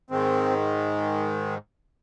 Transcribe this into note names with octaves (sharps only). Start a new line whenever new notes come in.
G#2 D#3 G#3 C4